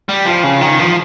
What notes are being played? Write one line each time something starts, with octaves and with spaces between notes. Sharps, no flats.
G3
F3
C#3
D#3
F3